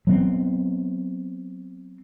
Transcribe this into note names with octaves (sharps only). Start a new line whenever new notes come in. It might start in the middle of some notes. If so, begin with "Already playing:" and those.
F#3 B3 C4